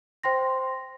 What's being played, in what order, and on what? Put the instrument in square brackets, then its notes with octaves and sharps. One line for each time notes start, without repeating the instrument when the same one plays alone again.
[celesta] C5 G5 C6 A#6